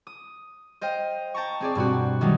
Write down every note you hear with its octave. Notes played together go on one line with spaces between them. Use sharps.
D#6
C5 D#5 F5 G5
G5 A5 A#5 C#6
C4 G#4 D5
G2 B2 C4 F#4
D#3 F#3 G3 A3 D#4